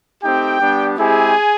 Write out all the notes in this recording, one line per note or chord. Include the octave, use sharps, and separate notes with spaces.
A3 C4 D#4 G4 G5
G3 B3 D4 G4
G#3 C4 E4 G4 G#4 G#5